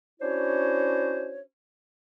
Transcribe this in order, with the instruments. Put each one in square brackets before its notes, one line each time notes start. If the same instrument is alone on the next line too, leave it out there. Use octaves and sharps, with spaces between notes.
[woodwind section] C#4 D4 E4 F#4 C5 C#5